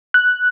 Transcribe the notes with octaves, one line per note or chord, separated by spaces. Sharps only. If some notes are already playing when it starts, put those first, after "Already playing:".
F#6